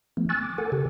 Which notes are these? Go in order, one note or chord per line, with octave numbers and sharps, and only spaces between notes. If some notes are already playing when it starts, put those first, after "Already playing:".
F3 A3 B3
G#5 C#6 E6 F#6 A6
D6
A4 A#4 F#5 G#5
C#3 G4 A4